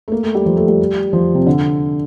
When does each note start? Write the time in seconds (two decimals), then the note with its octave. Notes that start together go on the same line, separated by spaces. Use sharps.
0.08 A3
0.12 A#3
0.23 A3
0.35 G3
0.46 F3
0.57 A3
0.68 G3
1.13 F3
1.35 C3
1.47 D3